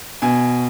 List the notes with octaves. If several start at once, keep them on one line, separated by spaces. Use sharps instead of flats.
B2 G#5